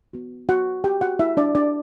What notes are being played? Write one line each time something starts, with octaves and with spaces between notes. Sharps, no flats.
B3 F#4
F#4 F#5
G4 G5
F#4 F#5
E4 E5
D4 D5
D4 D5